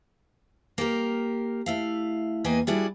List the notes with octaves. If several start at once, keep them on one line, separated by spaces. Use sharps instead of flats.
A#3 G4 A#4
A3 E4 F5
E2 A#3 B4 D#5 G5 G#5
G3 D4 E4 F#4 G#4 D5